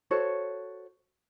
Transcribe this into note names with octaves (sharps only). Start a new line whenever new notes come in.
F#4 A4 C5 C#5